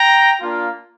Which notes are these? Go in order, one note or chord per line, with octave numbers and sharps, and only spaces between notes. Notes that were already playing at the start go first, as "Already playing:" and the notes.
Already playing: G5 A#5
A#3 D4 F4